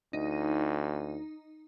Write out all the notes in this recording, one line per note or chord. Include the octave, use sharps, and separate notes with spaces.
D2 D#4